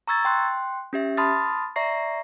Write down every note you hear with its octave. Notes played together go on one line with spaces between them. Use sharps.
A#5 C#6 E6 G#6 A6
G5 C6 F#6
C#4 G4 E5
A5 B5 C6 D#6 F6 A6
D5 E5 A#5 C#6 A#6 C7